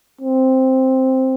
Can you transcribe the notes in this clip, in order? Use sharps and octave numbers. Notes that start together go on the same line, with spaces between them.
C4